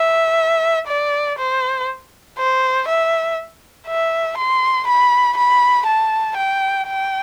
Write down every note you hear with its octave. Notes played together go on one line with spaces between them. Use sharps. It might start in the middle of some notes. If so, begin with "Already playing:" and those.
Already playing: E5
D5
C5
C5
E5
E5
C6
B5
B5
A5
G5
G5